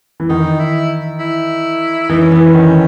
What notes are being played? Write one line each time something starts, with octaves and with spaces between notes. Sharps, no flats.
E3
D#3 D#4
E4
E4
E3 D#4
C#4
E3 B3
C#4
D#3